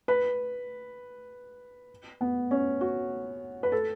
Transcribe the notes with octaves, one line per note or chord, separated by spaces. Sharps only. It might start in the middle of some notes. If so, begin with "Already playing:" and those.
B4
B3
C#4
F#4
B4
A4